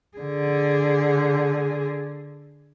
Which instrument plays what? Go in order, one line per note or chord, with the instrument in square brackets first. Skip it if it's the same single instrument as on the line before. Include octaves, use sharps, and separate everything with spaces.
[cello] D3 G#4